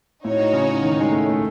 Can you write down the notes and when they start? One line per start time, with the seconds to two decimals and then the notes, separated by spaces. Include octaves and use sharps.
0.25 A2 D#4 F#4 C#5
0.53 C#3
0.83 D#3
1.00 G#3
1.12 A3
1.30 A3